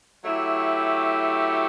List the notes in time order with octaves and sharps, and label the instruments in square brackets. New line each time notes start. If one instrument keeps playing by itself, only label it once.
[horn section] F#3 A3 E4 G4